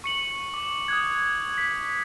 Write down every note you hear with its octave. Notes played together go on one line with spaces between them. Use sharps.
C#6 C#7 F#7
D6
D#6 F#6 G#6
B6